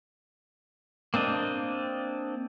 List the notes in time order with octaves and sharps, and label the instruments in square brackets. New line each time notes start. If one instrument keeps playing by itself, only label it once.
[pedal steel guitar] A#3 C4 D4 D#5